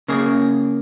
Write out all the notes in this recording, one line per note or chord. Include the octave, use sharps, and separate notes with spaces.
C#3 A#3 G#4